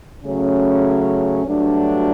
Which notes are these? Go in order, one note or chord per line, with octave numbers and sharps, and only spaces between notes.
C#3 F#3 A3 C#4
G2 F#3 A3 D4 F#4